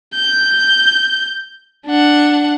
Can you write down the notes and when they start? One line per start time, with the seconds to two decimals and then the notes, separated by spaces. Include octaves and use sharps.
0.15 G6
1.87 D4 F#5